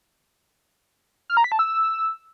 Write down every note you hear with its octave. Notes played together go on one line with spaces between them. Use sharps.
F6
A#5
B6
A5
E6